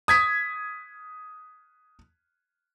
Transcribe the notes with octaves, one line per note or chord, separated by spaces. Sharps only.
D#6 G#6 B6